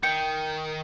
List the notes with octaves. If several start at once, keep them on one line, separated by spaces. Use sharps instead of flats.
D#3 G5 C#7